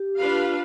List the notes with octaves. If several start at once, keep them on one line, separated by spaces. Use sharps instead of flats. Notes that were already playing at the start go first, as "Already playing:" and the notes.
Already playing: G4
D4 F4 B4 F5